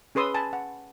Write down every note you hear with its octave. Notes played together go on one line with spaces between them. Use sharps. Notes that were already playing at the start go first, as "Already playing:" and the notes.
C#4 G#4 B4 C6 D#6 E6
G#5 A5 B5
F#5